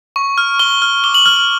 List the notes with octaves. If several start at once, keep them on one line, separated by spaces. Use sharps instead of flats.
C#6
F6
C#6 G7
F6
D6 G7
F#7
F6
F#7